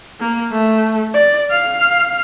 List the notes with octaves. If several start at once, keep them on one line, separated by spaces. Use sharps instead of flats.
A#3
A3
D5
F5